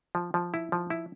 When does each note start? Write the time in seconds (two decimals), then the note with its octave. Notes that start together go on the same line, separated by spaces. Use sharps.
0.15 F3
0.34 F3
0.54 E4
0.72 F3
0.90 E4